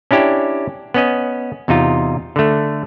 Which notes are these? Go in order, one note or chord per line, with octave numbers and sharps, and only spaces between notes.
C#4 D4 E4 G4
B3 C#4 D#5
E2 C3 D#4 F4
D3 A3